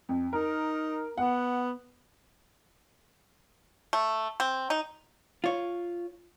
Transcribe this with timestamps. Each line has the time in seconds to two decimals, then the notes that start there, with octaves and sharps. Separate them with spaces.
0.09 F2
0.33 D#4 A#4
1.18 B3 F#5
3.93 A3
4.40 C4
4.70 D#4
5.44 F4 C#5